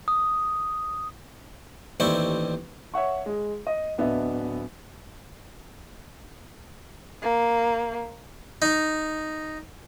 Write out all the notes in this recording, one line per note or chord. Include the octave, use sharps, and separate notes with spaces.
D#6
A1 D#2 C4 E4 D5 C#6
C#5 E5 F#5 C#6
G#3 G#4
D#5
D1 B3 D4 D#5 E5
A#3
D#4